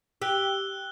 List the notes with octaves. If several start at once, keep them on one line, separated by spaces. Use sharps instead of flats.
G4 E6 F#6 G7